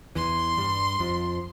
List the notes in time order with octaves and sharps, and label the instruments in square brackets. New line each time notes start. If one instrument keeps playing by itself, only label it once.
[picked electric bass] E2 E3 [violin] C6
[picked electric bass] G2 G3
F2 F3